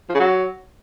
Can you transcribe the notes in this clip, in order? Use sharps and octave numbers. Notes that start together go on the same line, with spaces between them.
F3
C#3
F#3